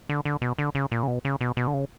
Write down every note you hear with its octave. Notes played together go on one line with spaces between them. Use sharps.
D3
D3
B2
D3
C#3
A#2
C#3
B2
C#3
B2
B2
D3
C#3